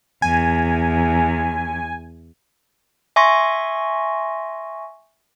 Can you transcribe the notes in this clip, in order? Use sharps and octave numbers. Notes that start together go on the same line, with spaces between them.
E2 G#5
E5 G#5 C6 C#6 A#6